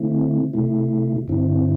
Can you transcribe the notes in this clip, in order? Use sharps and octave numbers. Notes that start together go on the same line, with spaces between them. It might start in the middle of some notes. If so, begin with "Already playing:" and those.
Already playing: D3 A3 C4 E4
C3 A3 E4
G2 D3 C4 E4